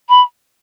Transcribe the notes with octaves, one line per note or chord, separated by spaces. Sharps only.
B5